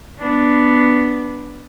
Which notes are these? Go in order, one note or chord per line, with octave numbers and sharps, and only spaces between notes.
B3 D4